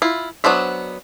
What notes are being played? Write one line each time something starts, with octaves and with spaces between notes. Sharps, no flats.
E4 F4
F#3 B3 D4 C5 E5